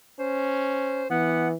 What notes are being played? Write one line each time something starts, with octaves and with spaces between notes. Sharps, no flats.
C#4 C5
E3 B3 F#5